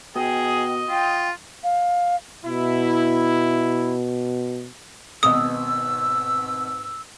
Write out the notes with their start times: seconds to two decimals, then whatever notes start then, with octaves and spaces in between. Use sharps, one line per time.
0.16 B2 G#4 D#5 G5
0.89 F4 G5
1.64 F5
2.46 B2 E4
5.23 G#1 G#2 B2 B4 D#5 D#6 E6